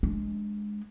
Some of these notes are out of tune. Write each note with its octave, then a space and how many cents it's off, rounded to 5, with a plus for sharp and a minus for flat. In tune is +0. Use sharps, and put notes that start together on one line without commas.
G#3 +0 D4 +0